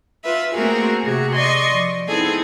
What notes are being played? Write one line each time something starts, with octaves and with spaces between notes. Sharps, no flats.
F4 B4 E5
A3 A#3 C4 F#4 G#4 A#4
C3 F#4 G#4
D5 D#5 C6 C#6 D#6
F3
B3 C4 D#4 E4 G#4 A4